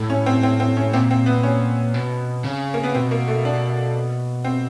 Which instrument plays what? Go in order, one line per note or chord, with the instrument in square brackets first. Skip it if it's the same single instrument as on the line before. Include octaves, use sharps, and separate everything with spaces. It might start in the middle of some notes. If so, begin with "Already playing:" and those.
Already playing: [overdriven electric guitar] A2
[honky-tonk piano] C#4
C4
C4
C4
C#4
[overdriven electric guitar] A#2 [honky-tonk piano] C4
[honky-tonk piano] C4
B3
C#4
[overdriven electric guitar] B2
C#3
[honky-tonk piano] A#3
B3
[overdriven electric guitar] B2 [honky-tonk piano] C4
[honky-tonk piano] A#3
A3
D4
C4